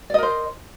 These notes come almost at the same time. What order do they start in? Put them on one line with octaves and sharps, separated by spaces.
D5 D#5 A#4 C5